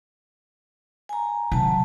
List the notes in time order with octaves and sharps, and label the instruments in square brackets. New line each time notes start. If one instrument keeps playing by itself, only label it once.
[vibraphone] G#5 A#5
[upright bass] C3 D#3 [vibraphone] F#3 A5